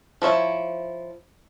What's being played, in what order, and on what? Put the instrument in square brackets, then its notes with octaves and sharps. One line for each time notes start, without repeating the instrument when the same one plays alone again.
[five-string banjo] F3 E4 C#5 E5